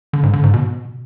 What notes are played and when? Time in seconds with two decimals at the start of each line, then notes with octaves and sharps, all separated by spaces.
0.13 D3
0.23 G#2
0.33 D3
0.43 G#2
0.54 B2